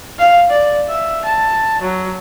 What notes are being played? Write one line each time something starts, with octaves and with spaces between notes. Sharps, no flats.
F5
D5
E5
A5
F#3